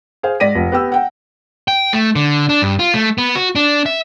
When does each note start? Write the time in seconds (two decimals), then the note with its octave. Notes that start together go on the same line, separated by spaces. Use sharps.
0.23 G#4 C5 F5
0.40 G#2 D5 A#6 B6 D#7
0.55 F1
0.72 B3 G4 E6
0.92 F#5 G5
1.68 G5
1.93 A3
2.16 D3
2.49 D4
2.62 G2
2.79 F4
2.94 A3
3.18 B3
3.35 F#4
3.55 D4
3.86 E5